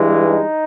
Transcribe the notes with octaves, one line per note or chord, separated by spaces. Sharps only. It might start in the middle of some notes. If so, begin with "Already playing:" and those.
Already playing: G2 E3 G#3
D#4